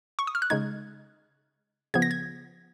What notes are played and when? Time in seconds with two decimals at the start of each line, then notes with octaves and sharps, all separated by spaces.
0.19 C#6
0.27 D#6
0.35 F6
0.42 F#6
0.50 C#3 G#3 D#4 G#6
1.94 C#3 F3 B3 G#6
2.02 A#6
2.11 G#6